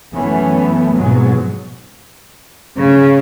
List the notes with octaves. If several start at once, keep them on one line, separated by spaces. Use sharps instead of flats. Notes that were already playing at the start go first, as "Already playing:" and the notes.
F#2 E3 A3 B3 C#4
F2 G#2 B2 F#3 G#3
C#3